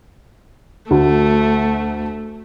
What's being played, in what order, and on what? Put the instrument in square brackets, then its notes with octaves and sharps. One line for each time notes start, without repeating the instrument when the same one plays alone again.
[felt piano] D2 [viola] A3